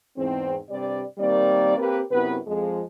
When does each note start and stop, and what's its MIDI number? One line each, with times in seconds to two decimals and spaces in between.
0.16 0.56 40
0.16 0.56 44
0.16 0.56 60
0.70 1.03 43
0.70 1.03 48
0.70 1.03 55
0.70 1.03 74
1.18 1.76 51
1.18 1.76 55
1.18 1.76 58
1.18 1.76 60
1.18 1.76 74
1.78 2.01 58
1.78 2.01 60
1.78 2.01 67
1.78 2.01 70
1.78 2.01 71
2.11 2.37 42
2.11 2.37 48
2.11 2.37 59
2.11 2.37 64
2.11 2.37 71
2.46 2.82 41
2.46 2.82 53
2.46 2.82 56